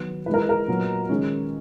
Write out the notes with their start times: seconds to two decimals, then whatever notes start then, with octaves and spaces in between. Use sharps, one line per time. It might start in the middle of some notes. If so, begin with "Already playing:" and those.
Already playing: D#3 F#3 B3
0.26 E3 B4
0.29 G#3 D#4 A#4
0.49 A#4
0.68 A#2 F#3 B3 D#4
1.09 D#3 G#3 C#4